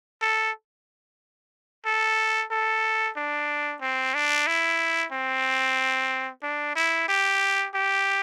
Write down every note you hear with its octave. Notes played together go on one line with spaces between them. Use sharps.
A4
A4
A4
D4
C4
D4
E4
C4
D4
E4
G4
G4